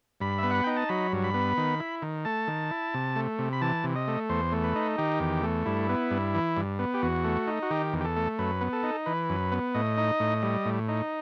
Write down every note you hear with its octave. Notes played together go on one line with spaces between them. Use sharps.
G2 B5
B3 E5
F#5
D#4 G5
A5
F#3 B5
G2
B5
B3
D#3
E4
D#3
A3 A5
D#3
E4
C3
A3
C3
B5
E3 A5
C3
D#5
A3
E2 C5
A3
B4
D#4
D#3 G4
E2
A3
G2 E4
B3
G2
E3
G2
B3
G4
E2 F#4
A3
D#4
F#4
D#3 G4
E2
G4
A4
A3
F#2 B4
B3
A4
D#4
E3 B4
F#2
B3
A2 D#5
D#4
A2
G3
A2
D#4